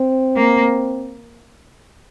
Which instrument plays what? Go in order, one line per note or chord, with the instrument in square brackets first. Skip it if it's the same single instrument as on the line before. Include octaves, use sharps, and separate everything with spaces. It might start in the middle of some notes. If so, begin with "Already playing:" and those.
Already playing: [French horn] C4
[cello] A#3